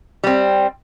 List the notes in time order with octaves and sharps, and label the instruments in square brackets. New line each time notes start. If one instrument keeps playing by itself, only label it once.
[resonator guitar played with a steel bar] G3 C4